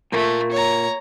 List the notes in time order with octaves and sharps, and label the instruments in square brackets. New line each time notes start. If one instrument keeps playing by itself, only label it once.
[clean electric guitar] A#2 A#3 [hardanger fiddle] A3
[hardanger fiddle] C#5 A#5